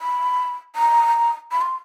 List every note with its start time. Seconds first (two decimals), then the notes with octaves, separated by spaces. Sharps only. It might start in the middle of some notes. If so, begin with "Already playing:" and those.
0.01 B5
0.76 A#5
1.52 B5
1.61 C6